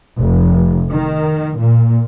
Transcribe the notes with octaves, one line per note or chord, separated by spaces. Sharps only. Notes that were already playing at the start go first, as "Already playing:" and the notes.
F1
D#3
A#2